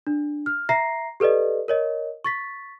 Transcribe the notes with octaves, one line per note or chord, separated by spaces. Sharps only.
D4
F6
E5 A#5 A#6 C7
G4 A4 B4 D5 D#5
A#4 C#5 D#5
C#6 A6 B6